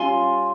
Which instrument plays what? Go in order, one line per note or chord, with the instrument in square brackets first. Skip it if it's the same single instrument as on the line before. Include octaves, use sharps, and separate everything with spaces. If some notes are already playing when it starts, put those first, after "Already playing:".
Already playing: [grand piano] G3 C#4 F4 [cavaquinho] G#5 C6